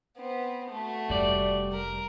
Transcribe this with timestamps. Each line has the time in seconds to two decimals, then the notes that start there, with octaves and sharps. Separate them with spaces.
0.17 B3 C4
0.71 A3 F#4
1.09 F1 G3 D5
1.72 A#4